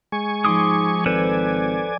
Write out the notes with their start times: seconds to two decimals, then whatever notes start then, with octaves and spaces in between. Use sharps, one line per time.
0.12 G#3 G#5 C#6
0.45 G#2 F3 C6 D6 D#6
1.06 G#1 A4 B4 C5 D5 G#5